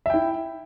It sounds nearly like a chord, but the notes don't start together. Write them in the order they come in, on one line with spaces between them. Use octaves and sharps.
E5 G5 E4